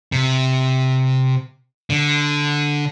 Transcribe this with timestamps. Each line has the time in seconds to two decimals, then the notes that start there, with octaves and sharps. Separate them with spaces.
0.12 C3
1.90 D3